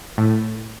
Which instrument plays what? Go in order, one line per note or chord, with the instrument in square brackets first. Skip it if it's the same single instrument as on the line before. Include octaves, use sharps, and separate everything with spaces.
[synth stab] A2